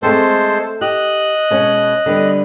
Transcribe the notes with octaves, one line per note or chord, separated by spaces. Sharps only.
G#3 A3 C4 A4 C5
G4 D#5 F#6
B2 G#3 C#4
D3 G3 B3